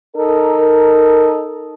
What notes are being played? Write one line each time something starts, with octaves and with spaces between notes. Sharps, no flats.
D#4 A4 A#4